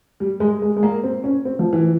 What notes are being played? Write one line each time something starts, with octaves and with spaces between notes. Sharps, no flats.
G3
G#3
G#3
G#3
A#3
C4
C#4
C4
F3
E3